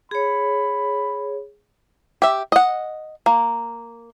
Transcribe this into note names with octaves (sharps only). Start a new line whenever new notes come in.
G#4 C#5 B5
G4 E5
D#5 F#5
A#3